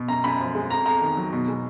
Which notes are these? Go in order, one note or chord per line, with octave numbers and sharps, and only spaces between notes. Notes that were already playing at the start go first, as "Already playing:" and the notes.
Already playing: B2
F#2 A#5
F#2 B5
F3
G#3
F2 A#5
F2 A#5
D#3
F#3
B2
G#3